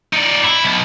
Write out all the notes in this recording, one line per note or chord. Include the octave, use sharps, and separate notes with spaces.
D#4 D5
E4
B1